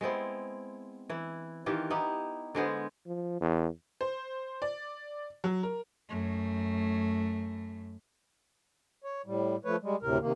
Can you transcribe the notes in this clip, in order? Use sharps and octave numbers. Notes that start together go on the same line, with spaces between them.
G#3 B3 C4 E4
E3 E4
D#3 E3 F4 G4
B3 D#4 E4 G4
D3 G#3 B3 C5
F3
E2
C5
D5
F#3
A#4
F#2 A3
C#5
A2 G3
F3 A3 B4 C#5
G3 G#3
D2 A2 C3 A#4
C3 D#3 A#3